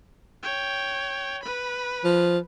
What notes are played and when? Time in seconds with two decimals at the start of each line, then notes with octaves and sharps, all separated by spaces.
0.43 C#5 G5
1.43 B4 B5
2.04 F3